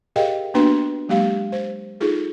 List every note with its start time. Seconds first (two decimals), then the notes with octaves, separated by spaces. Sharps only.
0.16 G4 G#4 A#4 D#5 F5 G5
0.54 A#3 B3 D4 F#4 B4 C6
1.09 F#3 G#3 A#3 G4 F5
1.52 C5
2.01 D#4 F4 G#4 A4